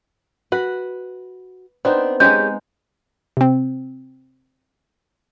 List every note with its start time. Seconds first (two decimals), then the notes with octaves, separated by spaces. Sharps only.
0.52 F#4 B4
1.85 B3 C4 D4 D#4
2.20 G#3 C#4 D#4 G4 G#4 G6
3.37 C3 C4